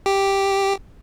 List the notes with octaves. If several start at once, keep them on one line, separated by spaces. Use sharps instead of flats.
G4